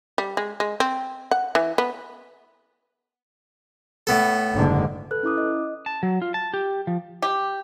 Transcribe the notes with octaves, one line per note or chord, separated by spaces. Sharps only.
G3
G#3
G#3
C4
F#5
E3
B3
A2 B3 A4
F#1 G#2 D3
A4 B4 F#6
C#4 E4 D6 D#6
D#5
A5
F#3
F4
A5
G4
F3
G4